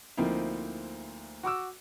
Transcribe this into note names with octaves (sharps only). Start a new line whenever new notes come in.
D2 F3 A#3 C4 D#4 E4
F#4 C#6 D6 E6